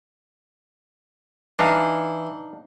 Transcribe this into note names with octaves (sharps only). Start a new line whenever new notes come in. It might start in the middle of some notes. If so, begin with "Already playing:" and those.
E3 D4 D#4 F5